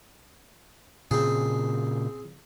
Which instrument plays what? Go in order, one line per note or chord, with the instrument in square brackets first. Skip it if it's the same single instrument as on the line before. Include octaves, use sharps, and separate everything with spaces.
[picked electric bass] A#2 C#3 [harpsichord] C4 G#4